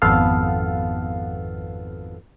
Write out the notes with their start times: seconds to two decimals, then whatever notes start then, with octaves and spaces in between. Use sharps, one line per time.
0.02 G#1 F2 B3 A4 F5